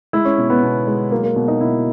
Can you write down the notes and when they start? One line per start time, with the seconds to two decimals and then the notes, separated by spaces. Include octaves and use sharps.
0.13 G#3 E4
0.25 C#4
0.38 B2
0.50 B3
0.63 B2
0.87 G#3
1.11 F#3 A#3
1.23 A#3
1.36 B2
1.48 D#4
1.61 B2 E4